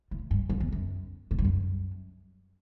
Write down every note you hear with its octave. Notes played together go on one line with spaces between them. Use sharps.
A2
G2
F#2
E2
F#2
A2
G2
F#2